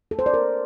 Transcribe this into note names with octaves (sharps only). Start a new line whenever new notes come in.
A4
C5
D5
A#4